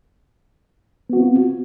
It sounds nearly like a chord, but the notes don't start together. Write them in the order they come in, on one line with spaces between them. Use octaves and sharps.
B3 F#4 C4 F4